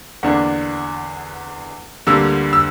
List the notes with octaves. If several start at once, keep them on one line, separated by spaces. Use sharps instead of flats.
E2 D3 A#3 D4 F#5
D2 D3 G3 A#3 E6
E6